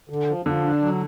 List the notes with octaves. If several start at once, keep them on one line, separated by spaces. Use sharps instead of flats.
D3
F3
D3 F3
D4
F#3